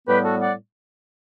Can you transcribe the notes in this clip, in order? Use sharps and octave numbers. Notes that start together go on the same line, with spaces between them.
A2 G3 B3 G4 B4
F#4 A4
D5 F#5